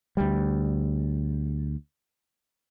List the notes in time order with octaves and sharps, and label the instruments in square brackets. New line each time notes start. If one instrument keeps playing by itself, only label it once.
[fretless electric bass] D2 G3